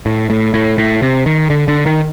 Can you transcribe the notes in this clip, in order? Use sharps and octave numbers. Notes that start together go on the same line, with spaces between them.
A2
A2
A2
A2
C3
D#3
D3
D3
D#3